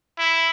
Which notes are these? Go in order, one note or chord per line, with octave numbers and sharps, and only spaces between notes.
E4